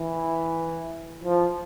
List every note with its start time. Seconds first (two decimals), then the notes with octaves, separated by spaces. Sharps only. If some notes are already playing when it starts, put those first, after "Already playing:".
Already playing: E3
1.23 F3